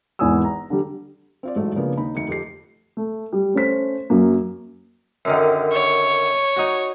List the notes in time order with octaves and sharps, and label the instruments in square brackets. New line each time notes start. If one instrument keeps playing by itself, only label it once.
[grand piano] G#1 E2 B3 G#5 D#6 E6
A#5
D3 G3
[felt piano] C4 F4 D5
A1 G#2 F#3 A3
C#3 F3 A#3 B3 D4
D#2 D#4 B5
F1 D2 D#4 C#7
F2 G4 A4 C7
[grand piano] A3
G3
A3 C#4 C5 B6
F#2 A#3
[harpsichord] F#2 D3 D#3
[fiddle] C#5
[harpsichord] D#4 F#4